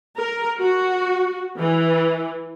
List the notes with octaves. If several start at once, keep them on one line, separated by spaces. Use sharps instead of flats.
A#4
F#4
E3